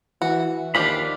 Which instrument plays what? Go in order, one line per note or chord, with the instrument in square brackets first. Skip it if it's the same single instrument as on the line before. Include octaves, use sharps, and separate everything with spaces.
[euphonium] E3 [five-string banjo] F#4
[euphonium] D#2 [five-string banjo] F3 D4 G4 [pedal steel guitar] D5 F5 B5